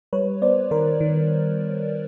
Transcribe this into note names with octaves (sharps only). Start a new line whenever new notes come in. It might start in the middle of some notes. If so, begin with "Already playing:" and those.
G3 B4 C#5
B3 C5 D5
D#3 A#4 C5
D#3